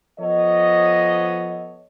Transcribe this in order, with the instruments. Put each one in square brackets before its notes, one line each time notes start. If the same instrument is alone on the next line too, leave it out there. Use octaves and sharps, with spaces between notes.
[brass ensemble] F3 B3 A4 C#5 D#5